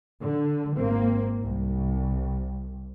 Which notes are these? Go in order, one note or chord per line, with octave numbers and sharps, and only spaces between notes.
D3
G#1 A#3 C4
C2